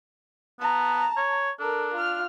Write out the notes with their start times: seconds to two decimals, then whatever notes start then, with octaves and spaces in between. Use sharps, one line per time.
0.60 B3 A5 A#5
1.17 C#5
1.60 D4 A4 A#4
1.94 F4 F6